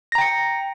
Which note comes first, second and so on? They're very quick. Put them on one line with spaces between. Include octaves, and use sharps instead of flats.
A#6 A#5 G5 C#7